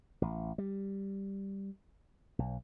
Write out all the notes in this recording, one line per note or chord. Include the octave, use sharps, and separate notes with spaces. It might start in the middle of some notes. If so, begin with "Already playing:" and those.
A1
G3
B1